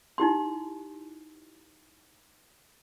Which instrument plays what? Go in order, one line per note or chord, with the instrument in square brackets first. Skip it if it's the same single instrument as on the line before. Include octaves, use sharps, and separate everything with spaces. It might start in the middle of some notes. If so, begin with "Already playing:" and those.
[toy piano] D#4 E4 G4 C6